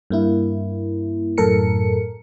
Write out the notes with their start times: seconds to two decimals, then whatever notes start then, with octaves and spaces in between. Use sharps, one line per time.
0.10 G2 A#3 E4
1.38 F#2 A2 A4 A#4 C#7